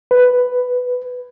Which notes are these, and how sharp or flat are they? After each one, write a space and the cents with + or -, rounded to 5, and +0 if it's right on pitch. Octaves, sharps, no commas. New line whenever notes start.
B4 +5